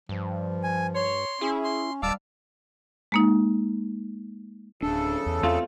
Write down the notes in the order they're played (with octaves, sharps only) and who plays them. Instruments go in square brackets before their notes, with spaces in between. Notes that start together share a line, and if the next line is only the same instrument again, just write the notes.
[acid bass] G2 [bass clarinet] F3
[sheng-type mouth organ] G#5
[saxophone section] C#5 [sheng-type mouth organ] C6
[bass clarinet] C#4 [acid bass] E4 [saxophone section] G#4
[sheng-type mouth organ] C6
[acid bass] D#1 [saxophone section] G#2 F5 [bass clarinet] G3 [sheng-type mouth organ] A5 D6 E6
[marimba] G#3 A#3 D#4
[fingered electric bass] D1 D4 [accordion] C#3 A4
[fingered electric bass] E2
[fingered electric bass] E2 [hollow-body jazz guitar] A3 C4 F4